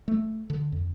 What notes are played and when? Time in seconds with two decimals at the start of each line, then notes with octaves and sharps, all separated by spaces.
0.08 A3
0.50 D3
0.72 F2